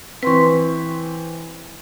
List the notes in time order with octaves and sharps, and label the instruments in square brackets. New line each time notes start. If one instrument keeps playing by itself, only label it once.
[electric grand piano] E3 C4 [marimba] B4 C6 C#6